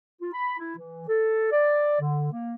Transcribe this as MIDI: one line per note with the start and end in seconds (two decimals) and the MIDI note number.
0.21 0.30 65
0.33 0.54 83
0.59 0.74 64
0.77 1.04 52
1.08 1.51 69
1.52 2.01 74
2.01 2.28 50
2.32 2.55 58